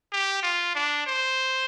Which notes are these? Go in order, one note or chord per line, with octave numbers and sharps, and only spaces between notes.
G4
F4
D4
C5